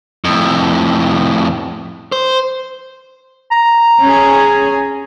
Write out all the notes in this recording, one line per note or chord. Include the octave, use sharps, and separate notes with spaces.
F2 A2
C5
A#5
C#4 G#4